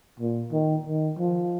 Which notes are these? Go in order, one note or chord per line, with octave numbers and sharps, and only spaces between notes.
A#2
D#3
D#3
F3